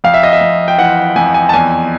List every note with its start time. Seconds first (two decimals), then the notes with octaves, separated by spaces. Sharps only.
0.04 F2 F5
0.14 E5
0.23 D#5
0.33 E5
0.41 F2
0.68 G5
0.78 E3 F#5
1.16 F2 G#5
1.34 G#5
1.49 A5
1.53 E2 G#5